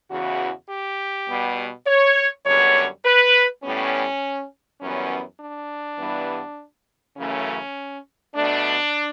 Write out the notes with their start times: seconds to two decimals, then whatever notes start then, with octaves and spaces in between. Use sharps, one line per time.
0.10 E2 C#3 E3 F#4
0.70 G4
1.29 B2 G3 B3
1.87 C#5
2.46 F#2 D3 G3 B3 C#5
3.05 B4
3.64 A2 G3 B3 C#4
4.81 F#2 E3 G3 B3 C#4
5.41 D4
5.99 G2 E3 G3 B3
7.17 F#2 C#3 E3 A3 C#4
8.35 B2 A3 D4